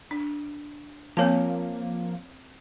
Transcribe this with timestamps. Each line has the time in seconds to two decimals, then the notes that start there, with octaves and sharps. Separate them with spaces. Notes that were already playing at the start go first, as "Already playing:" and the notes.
0.11 D4
1.17 F3 A#3 C4 C#5 A5